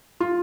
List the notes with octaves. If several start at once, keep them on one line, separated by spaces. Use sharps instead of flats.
F4